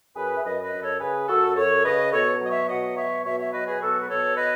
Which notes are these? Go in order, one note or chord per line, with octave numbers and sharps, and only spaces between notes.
F#2 G#4 B4
E5
F#2 B4 D#5
B4 D#5
F#2
A4 C#5
C#3 G#4 B4
F#2 F#4 A4
F#2 A4 C#5
C#3 B4 D#5
B2 A4 C#5
F#3 D#5
C#5 E5
B2 D#5 F#5
F#3 C#5 E5
B2 C#5 E5
C#5 E5
F#3 B4 D#5
G#4 B4
B2 F#4 A4
B4
B2 A4 C#5
B4 D#5